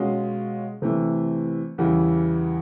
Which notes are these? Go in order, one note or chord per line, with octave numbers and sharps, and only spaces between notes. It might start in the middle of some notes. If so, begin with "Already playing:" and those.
Already playing: B2 G#3 C#4 F4
C3 E3 A3
E2 C#3 E3 G3